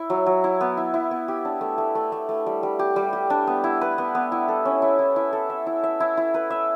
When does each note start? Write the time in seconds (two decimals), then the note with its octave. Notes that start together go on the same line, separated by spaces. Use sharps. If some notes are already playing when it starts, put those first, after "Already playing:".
Already playing: E4
0.10 F#3
0.26 F#3
0.44 E4
0.61 B3
0.77 E4
0.94 E4
1.11 B3
1.28 G4
1.45 D4
1.61 A3
1.78 A3
1.95 A3
2.12 A3
2.29 A3
2.46 G3
2.63 G3
2.79 G4
2.96 G3
3.13 G4
3.30 D4
3.47 B3
3.64 E4
3.81 B4
3.98 B3
4.15 B3
4.32 E4
4.48 A4
4.65 C#4
4.82 E4
4.99 E4
5.16 E4
5.33 A4
5.50 E5
5.67 E4
5.83 E5
6.00 E4
6.17 E4
6.34 B4
6.50 E5